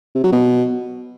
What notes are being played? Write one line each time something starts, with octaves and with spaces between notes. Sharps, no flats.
C3
F#3
B2